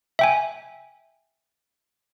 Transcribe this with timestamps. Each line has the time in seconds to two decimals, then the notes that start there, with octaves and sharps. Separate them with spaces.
0.19 E5 G5 G#5